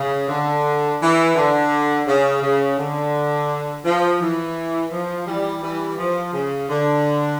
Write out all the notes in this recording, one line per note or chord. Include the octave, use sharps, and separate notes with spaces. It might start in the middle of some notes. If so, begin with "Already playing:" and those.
Already playing: C#3
D3
E3
D3
C#3
C#3
D3
F3
E3
F3
E3 G3
E3 G3
F3
C#3
D3